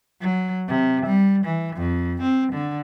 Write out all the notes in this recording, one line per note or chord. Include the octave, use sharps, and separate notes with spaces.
F#3
C3
G3
E3
F2
C4
D3